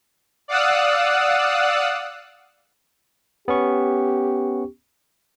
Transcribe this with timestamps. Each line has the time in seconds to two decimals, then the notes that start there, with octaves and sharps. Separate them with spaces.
0.48 D5 F5 F#5 D#6 E6 F#6
3.48 B3 C#4 G4 C#6